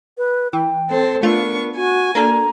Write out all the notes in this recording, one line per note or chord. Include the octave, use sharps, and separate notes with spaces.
B4
E3 G5
C4 A4 C5
A3 B3 D4 F4 A#4 C#6
F#4 G#5
A#3 D4 A4 A#5